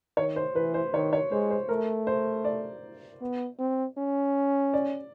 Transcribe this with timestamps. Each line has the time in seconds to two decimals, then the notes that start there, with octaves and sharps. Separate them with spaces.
0.17 D#3 C#5
0.36 C5
0.55 E3 B4
0.74 C5
0.93 D#3 C#5
1.13 C#5
1.32 G#3 C5
1.50 C5
1.69 A3 A#4
2.07 C5
2.44 D5
3.21 B3
3.59 C4
3.97 C#4
4.73 D5